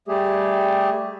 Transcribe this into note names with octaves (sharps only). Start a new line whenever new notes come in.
G3 A3 G4 G#4